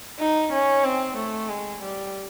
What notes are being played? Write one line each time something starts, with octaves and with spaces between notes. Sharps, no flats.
D#4
C#4
C4
A3
G#3
G3